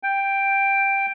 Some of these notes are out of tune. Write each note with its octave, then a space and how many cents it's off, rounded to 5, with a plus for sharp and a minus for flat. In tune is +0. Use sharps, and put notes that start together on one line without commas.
G5 +5